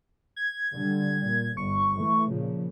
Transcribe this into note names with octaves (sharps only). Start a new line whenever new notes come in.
G#6
D3 G3
A#2
G1 C#6
E3 A3
A#2 C#3 F3